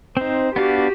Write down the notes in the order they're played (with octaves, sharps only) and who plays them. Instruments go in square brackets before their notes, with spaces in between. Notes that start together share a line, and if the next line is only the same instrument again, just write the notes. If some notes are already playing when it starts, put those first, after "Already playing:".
[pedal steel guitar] C4 D#4 [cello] C5
[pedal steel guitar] B3 D4 F5 [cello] F#4 G4